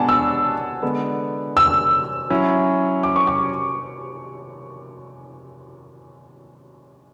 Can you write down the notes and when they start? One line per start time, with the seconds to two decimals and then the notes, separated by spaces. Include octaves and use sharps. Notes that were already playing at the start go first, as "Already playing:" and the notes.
Already playing: B2 G#3 B3 D4 F#5 G#5 A5
0.09 E6
0.83 D3 G#3 B3
1.57 E6
2.30 F#3 C#4 E4
3.03 D6
3.16 C#6
3.27 D6